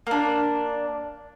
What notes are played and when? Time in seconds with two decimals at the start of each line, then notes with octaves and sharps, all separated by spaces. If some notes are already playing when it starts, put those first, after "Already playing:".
0.07 A#3 D4